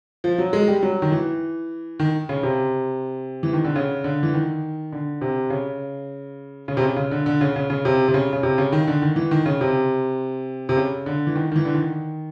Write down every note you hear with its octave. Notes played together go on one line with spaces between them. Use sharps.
F3
F#3
G#3
G3
F#3
D#3
E3
D#3
C#3
C3
E3
D#3
D3
C#3
D3
E3
D#3
D3
C3
C#3
C#3
C3
C#3
C#3
D3
D3
C#3
C#3
C#3
C3
C3
C#3
C#3
C3
C#3
D#3
D3
D#3
E3
D#3
C#3
C3
C3
C#3
D3
E3
D#3
D#3
E3
D3
D#3